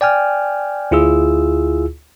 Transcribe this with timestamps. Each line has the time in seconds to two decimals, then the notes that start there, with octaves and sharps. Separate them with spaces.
0.01 D5 G5 G#5 F6
0.91 D2 E4 F4 G#4 E6